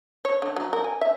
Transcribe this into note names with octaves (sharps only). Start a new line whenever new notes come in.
C#5
D3
F#3
A#4
G#5
E5